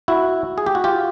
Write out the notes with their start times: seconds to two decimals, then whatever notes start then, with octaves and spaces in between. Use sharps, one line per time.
0.08 E4 F#4
0.58 G#4
0.66 G4
0.75 F#4
0.84 F4 G4